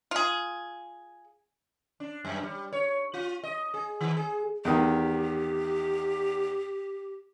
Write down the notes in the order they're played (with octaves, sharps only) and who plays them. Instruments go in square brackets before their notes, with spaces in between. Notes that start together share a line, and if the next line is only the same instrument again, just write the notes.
[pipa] F4 G#4
[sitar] D4
F#2
G3
C#5
F4
D#5
G#4
D#3
G#4
[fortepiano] E2 D#3 [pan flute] G4